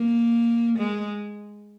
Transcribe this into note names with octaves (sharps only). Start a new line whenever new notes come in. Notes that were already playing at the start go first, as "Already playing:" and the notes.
Already playing: A#3
G#3